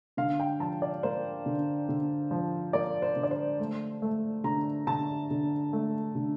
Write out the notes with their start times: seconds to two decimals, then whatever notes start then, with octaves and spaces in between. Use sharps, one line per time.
0.17 D3 F5
0.40 G5
0.60 F3 A5
0.82 D5
1.03 A#3 C5
1.46 D3
1.89 D3
2.31 F3
2.73 A#3 D5
3.02 C5
3.16 D3
3.23 D5
3.31 C5
3.60 A3
4.02 A3
4.44 D3 A#5
4.87 D3 A5
5.31 D3
5.73 A3
6.15 D3